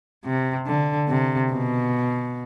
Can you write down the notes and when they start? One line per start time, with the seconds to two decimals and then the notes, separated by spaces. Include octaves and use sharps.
0.25 C3
0.67 D3
1.09 C3
1.51 B2